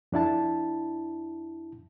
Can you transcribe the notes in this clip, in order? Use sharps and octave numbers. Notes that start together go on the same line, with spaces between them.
F2 D4 E4 A5